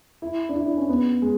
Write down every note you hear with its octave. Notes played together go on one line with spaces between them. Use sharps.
E4
D4
E4
D4
C#4
B3
G#3